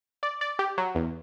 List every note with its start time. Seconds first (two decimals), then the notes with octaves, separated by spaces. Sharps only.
0.23 D5
0.41 D5
0.59 G4
0.78 F#3
0.95 E2